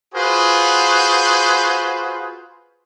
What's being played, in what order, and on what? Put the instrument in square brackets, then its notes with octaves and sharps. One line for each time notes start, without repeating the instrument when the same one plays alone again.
[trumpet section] F4 F#4 G#4 B4 C5